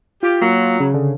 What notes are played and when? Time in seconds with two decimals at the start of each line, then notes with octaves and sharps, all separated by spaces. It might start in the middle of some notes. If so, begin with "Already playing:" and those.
0.23 F4 G4
0.42 F#3 A#3
0.80 C#3
0.94 D3